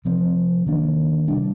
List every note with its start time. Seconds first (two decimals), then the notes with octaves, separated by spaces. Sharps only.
0.05 C3 F3 C4
0.67 D#3 A#3 D4
1.28 C3 G3 D4